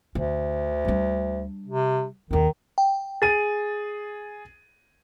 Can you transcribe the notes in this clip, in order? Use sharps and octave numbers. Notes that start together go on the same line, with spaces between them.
D2 D3
G3 D4
C3
D#2 D#3 D#4
G5
G#4 A6 D#7